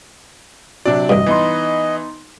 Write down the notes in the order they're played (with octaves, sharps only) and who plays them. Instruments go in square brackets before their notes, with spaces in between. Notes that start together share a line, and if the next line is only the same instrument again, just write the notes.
[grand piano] C3 F#3 [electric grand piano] D4 D5
[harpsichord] A1 G2 [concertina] D#5
[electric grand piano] E3 [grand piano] B3 D#4 C6